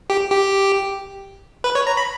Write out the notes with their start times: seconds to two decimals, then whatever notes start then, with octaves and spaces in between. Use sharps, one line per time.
0.10 G4
0.31 G4
1.64 B4
1.75 C#5
1.87 A#5
1.97 B5